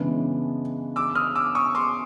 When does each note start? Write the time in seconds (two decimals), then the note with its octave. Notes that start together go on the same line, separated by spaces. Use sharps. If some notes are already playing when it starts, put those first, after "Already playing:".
Already playing: C#3 E3 G#3 B3 D4
0.96 D6 E6
1.15 D#6 F6
1.35 D6 E6
1.55 C#6 D#6
1.75 C6 D6